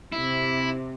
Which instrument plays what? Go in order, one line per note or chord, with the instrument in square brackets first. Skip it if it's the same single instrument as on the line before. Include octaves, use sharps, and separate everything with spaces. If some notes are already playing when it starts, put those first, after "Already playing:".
[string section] C3 [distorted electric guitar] E4